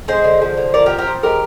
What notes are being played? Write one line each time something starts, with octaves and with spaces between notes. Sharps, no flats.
G#3 G#4 C5
D3
F3
D3
F3 A#4 D5
G4 A#4
C4
G4 A#4
F3
G#3 G4 A#4